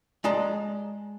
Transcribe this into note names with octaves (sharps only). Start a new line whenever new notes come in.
G#3 D5 D#5 A5 A#5